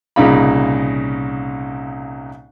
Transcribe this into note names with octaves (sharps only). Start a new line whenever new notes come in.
C2 A#2 C#3 D#4 F5 B5